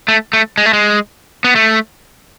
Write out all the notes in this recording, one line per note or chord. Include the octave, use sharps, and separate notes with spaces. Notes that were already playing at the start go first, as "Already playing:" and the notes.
A3
A3
G#3
A3
G#3
B3
A3